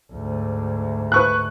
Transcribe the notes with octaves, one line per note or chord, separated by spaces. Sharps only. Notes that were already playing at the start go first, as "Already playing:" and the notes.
D2 G#2
B4 C#6 F#6